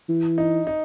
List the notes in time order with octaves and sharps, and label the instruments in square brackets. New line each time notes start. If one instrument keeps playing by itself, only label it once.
[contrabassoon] E3
[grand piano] D#4
D#4